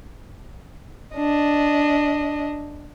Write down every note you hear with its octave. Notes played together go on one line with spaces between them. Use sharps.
D4 D#5